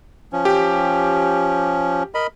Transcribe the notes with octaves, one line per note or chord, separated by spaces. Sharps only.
F3 C#4
G4
A#4 D#5 B5